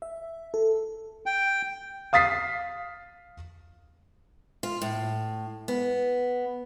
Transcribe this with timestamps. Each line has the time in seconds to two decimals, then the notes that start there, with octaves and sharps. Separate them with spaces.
0.02 E5
0.54 A4
1.26 G5
2.13 F5 D#6 A6 B6 C7
4.63 F4
4.82 A2
5.68 B3